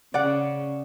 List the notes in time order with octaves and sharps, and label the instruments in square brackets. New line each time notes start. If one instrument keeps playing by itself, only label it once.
[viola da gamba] C#3 [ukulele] D5 F#5